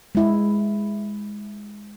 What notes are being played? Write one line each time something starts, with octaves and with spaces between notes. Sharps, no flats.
G#3 E4